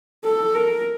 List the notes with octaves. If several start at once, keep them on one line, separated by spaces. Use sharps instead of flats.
A4
A#4